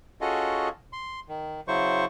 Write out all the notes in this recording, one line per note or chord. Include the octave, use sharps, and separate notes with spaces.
C#4 F4 F#4 G#4 A4 D#5
C6
D#3
C#3 F#3 E4 C5 C#6